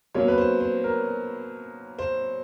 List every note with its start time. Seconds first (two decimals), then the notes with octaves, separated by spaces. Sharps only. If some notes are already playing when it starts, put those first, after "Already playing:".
0.15 B2 F#3 A#3 C#4 C#5
0.28 B4
0.38 C5
0.60 C5
0.84 A#4
1.99 C5